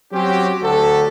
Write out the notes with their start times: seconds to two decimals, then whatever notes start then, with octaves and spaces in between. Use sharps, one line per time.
0.13 F#3 C4 C#4 F#4 G4
0.62 D2 F#3 F#4 G4 A4